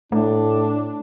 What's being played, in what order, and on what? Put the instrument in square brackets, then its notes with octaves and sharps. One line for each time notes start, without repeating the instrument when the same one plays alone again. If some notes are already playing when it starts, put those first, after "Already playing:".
[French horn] A2 [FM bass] A3 [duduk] D4